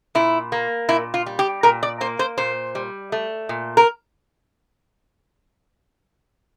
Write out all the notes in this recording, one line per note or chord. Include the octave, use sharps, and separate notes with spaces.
A#2 E4
A#3
A#2 E4
F4
G3
G4
A#2 A#4
D5
A#3 C5
C5
A#2 C5
G3
A3
A#2
A#4